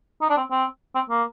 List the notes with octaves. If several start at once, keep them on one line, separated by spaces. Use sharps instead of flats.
D#4
D4
C4
C4
C4
A#3